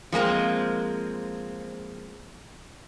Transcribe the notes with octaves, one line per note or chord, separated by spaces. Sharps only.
F3 G#3 A#3 C4